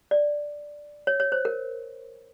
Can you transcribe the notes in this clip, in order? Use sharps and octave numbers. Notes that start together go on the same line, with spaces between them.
D5
C#5
C#5
C5
A#4